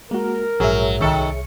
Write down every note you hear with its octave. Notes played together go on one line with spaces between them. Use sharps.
G#3 A#3 F#4 A#4
A#1 G#2 F#3 G#4 C#5 E5
C2 D#3 A4 C#6 C#7